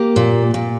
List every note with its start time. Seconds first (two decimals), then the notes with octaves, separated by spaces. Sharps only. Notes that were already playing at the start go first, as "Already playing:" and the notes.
Already playing: A#3 G4
0.16 A#2
0.54 A#2